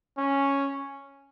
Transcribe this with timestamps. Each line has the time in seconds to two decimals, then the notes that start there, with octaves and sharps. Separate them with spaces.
0.18 C#4